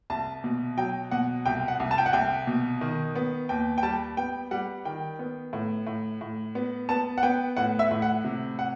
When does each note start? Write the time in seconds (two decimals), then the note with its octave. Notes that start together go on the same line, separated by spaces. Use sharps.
0.10 C2 A5
0.44 B2
0.77 F#3 G5
1.11 B2 F#5
1.46 C2 G5
1.68 F#5
1.80 C2
1.91 A5
1.98 G5
2.06 F#5
2.13 C2 G5
2.47 B2
2.81 D#3
3.15 B3
3.49 D#2 G5
3.78 G5
3.83 G3 A5
4.17 B3 G5
4.51 G3 F#5
4.85 D#3 G5
5.19 B3
5.53 A2
5.87 A2
6.21 A2
6.55 B3
6.89 B3 A5
7.18 F#5
7.23 B3 G5
7.57 A2 F#5
7.79 E5
7.91 A2
8.02 F#5
8.24 C3
8.59 F#5